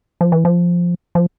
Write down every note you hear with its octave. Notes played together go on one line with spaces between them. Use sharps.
F3
E3
F3
F3